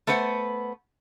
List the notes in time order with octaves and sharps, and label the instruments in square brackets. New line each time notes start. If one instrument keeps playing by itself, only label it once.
[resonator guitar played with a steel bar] A3 B3 B4 C5 F#5